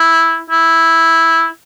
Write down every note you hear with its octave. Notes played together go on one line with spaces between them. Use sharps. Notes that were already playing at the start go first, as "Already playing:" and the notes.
Already playing: E4
E4